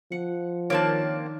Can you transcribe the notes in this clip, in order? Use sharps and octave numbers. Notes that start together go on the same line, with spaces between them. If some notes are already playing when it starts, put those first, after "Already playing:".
F3 F#5
D#3 A#3 C4 D4 C#5 A5